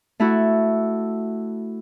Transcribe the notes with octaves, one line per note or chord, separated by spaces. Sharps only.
A3 E4 F#4